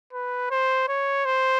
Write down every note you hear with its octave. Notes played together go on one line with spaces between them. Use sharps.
B4
C5
C#5
C5